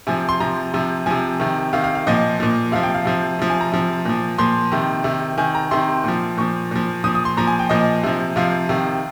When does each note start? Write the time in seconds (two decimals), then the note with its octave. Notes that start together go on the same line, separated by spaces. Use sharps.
0.07 C3 F3 G#5
0.29 C6
0.40 C3 F3 A#5
0.74 C3 F3
1.06 C3 F3 G#5
1.40 C3 D#3
1.73 C3 D#3 F5
1.84 F5
1.95 F5
2.07 A#2 F3 D#5
2.40 A#2 F3
2.72 C3 F3 F5
2.83 G5
2.95 F5
3.05 C3 F3
3.39 C3 F3
3.50 G#5
3.61 A#5
3.72 C3 F3
4.05 A#2 F3
4.38 A#2 F3 C6
4.72 C3 D#3
5.04 C3 D#3
5.38 C3 D#3 G#5
5.55 A#5
5.71 C3 D#3 C6
6.04 A#2 F3
6.38 A#2 F3 C#6
6.71 A#2 F3
7.04 A#2 F3 D#6
7.15 D#6
7.25 C6
7.37 A#2 F3 A#5
7.47 G#5
7.59 G5
7.69 A#2 F3 D#5
8.04 C3 F3
8.36 C3 F3 F5
8.69 C3 D#3